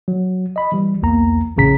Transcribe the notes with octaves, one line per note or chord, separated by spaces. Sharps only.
F#3
D#5 B5
E3 G3
B1 E2 A#3 A#5
A#1 A2 C#3 A#5 B6